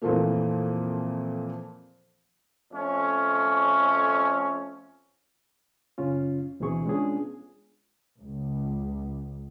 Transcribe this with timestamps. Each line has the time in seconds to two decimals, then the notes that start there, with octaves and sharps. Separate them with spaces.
0.02 F2 A#2 E3 F3 A3 A#3
2.72 F2 A3 C#4
5.98 F#2 C#3 C#4 F4
6.60 D2 B2 E3 C4 G#4 C#6
6.85 G#3 B3 C#4 D4 F4 G#4
8.20 C#2